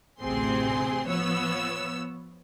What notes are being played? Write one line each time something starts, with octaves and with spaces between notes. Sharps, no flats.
A1 D2 C3 C4 G#4 C6
F3 B3 C#5 E6